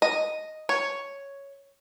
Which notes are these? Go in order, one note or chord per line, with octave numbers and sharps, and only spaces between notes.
D#5
C#5